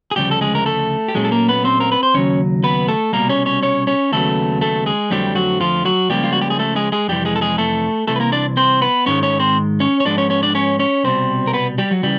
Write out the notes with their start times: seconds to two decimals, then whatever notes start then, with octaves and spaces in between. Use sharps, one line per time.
0.11 G#4
0.16 D2 C#3 F3 G3 G4
0.31 A4
0.41 G#3 G#4
0.55 A#4
0.66 A3 A4
1.08 G4
1.15 A#2 F#3 G#3 A3 C#4 G#4
1.25 A4
1.32 A#3 A#4
1.48 B3 B4
1.65 C4 C5
1.80 A#4
1.92 B4
2.03 C5
2.14 D#2 C#3 F#3 C#4 C#5
2.64 B3 B4
2.88 A3 A4
3.13 C2 B2 G3 A#3 A#4
3.29 C#4 C#5
3.46 C#4 C#5
3.63 C#4 C#5
3.87 C#4 C#5
4.12 D#2 C#3 F#3 A3 B3 A4
4.61 A3 A4
4.86 G#3 G#4
5.10 F2 D3 F#3 G3 A3 C4 G4
5.35 F#3 F#4
5.61 F3 F4
5.85 F#3 F#4
6.10 C#2 C#3 F3 G3 A#3 G4
6.24 F4
6.33 F#4
6.42 G4
6.50 G#4
6.59 A3 A4
6.76 G#3 G#4
6.92 G#3 G#4
7.08 F2 C3 E3 G3 G4
7.25 G#3 G#4
7.36 A4
7.41 G#3 G#4
7.58 A3 A4
8.07 C2 C3 E3 A3 A4
8.16 B4
8.20 A#3 A#4
8.32 D4 D5
8.57 C4 C5
8.81 B3 B4
9.06 G#2 D#3 G#3 C#4 C#5
9.23 C#4 C#5
9.40 C4 C5
9.80 C#4 C#5
10.00 C#5
10.05 G#2 F3 G#3 B3 D4 D5
10.18 C#4 C#5
10.30 C#4 C#5
10.43 D4 D5
10.55 C#4 C#5
10.79 C#4 C#5
11.04 C2 B2 G3 C4 C5
11.47 A#4
11.53 B3 B4
11.78 G3 G4
11.91 F#3 F#4
12.03 C#3 E3 G3